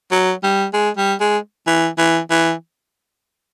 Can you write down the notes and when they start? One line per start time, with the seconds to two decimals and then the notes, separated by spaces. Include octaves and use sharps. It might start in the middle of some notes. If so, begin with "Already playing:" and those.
0.11 F#3
0.43 G3
0.73 G#3
0.97 G3
1.21 G#3
1.67 E3
1.98 E3
2.30 E3